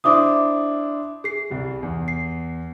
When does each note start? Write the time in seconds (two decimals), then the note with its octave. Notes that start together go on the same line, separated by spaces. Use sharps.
0.04 D4 E4 C5 E5 D6 D#6
1.24 G#4 C7
1.50 C2 G3
1.83 E2
2.08 C7